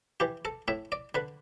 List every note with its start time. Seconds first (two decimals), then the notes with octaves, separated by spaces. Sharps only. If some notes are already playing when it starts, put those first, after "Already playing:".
0.20 E3 G4
0.45 A4
0.68 A2 E5
0.92 D5
1.15 D3 B4